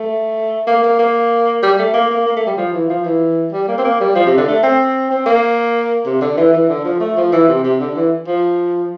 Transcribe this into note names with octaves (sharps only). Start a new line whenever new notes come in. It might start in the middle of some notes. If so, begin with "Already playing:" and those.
Already playing: A3
A#3
A#3
A#3
G3
A3
A#3
A#3
A#3
A3
G3
F3
E3
F3
E3
G3
A#3
C4
A#3
G3
F3
C3
D3
A3
C4
C4
A#3
C3
D3
E3
E3
D3
F3
A3
F3
E3
C3
C3
D3
E3
F3